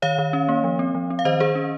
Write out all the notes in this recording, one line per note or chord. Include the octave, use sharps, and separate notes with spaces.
D#3 C#5 F5
D#3
C#4
A#3
F3
C4
F3
C4
F5
D#3 C5 D#5
D#3 G#4 C5
C#4